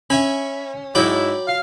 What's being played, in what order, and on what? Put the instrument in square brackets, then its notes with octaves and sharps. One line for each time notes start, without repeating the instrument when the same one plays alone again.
[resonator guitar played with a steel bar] C#4 [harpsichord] E5 G#5 B5
[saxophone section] G#2 E4 [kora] F#3 [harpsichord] D5 G5 B5
[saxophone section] F5